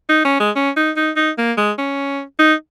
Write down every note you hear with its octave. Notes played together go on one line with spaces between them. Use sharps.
D#4
C#4
G#3
C#4
D#4
D#4
D#4
A#3
G#3
C#4
D#4